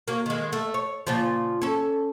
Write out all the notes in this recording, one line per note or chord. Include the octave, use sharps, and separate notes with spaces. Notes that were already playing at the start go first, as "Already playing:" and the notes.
F#3 A#3
D#3 G#3
A3
C#5
A#2 C#3 F3
C#4 A4